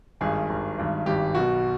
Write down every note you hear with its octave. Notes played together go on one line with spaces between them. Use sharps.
G#1 G2 D#3 G#4
G#1 G2 D#3
G#1 G2 D#3
G#1 G2 D#3 G4
B1 B2 F#4